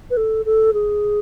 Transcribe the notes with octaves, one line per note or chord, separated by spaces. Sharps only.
B4
A4
A4
G#4